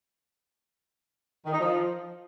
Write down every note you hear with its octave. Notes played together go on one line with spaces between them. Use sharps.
D#3
D#4
F3